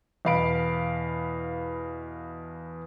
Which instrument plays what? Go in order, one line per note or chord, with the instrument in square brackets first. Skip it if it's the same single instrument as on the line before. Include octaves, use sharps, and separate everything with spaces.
[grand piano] E2 B2 F5 B5 D7